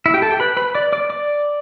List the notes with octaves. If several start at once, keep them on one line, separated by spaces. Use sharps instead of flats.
E4 E5
G4 G5
A4 A5
G4 G5
B4 B5
B4 B5
D5 D6
D5 D6
D5 D6